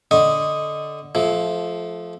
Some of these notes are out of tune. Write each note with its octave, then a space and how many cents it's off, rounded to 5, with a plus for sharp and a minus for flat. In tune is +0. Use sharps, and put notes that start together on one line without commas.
D3 -5 D#5 +0 C#6 -25
F3 +0 A3 -25